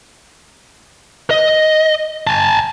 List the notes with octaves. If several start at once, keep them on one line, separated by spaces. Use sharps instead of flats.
D#5
G#5 A5